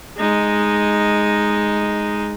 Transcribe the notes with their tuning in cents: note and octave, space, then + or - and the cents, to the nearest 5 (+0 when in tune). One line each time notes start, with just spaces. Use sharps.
G#3 +0 D#4 +0